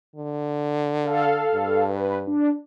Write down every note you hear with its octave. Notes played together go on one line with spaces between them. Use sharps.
D3
A4 F5
G2
B4
D4